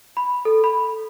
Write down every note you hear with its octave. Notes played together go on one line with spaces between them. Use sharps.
B5
A4
B5